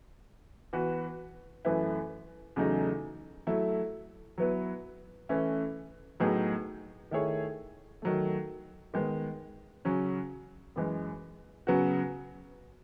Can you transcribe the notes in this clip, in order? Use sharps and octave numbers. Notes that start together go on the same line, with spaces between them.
E3 B3 F#4 B4
F#2 E3 A3 E4 B4
E2 C#3 F#3 A3 D#4
F#3 A3 E4
F#3 B3 E4 B4
E3 A3 C#4 E4
A2 F#3 B3 D#4 G#4
D#3 A3 E4 G#4 C#5
D#3 F#3 A3
D#3 G#3 B3
C#3 F#3 C#4
F#2 E3 G#3
C#3 F#3 B3 F#4